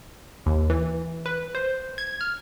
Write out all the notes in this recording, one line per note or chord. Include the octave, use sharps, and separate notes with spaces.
D#2
E3
B4
C5
G#6
F6